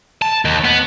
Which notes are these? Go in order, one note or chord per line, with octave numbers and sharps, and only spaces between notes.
A5
D#2
B3